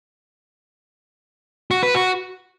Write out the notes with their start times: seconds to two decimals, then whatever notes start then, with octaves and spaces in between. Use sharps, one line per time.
1.71 F#4
1.83 B4
1.95 F#4